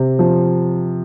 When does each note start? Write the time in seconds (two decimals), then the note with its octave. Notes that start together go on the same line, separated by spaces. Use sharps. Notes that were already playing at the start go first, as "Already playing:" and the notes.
Already playing: C3
0.19 F3